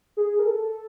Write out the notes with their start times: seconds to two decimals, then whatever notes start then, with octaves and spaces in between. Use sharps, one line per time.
0.17 G#4
0.39 A#4
0.47 A4